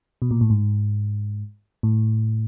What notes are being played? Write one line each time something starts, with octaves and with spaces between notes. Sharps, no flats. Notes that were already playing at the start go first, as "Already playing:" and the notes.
B2
A#2
A2
G#2
A2